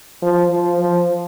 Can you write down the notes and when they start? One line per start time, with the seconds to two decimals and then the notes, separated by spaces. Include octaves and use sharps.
0.22 F3
0.50 F3
0.79 F3